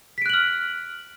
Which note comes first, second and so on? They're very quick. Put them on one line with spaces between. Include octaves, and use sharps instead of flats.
B6 D7 F#6 F#7 F6